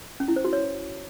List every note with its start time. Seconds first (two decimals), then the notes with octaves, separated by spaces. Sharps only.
0.20 C#4
0.28 E4
0.36 C5
0.45 F#4
0.53 C#5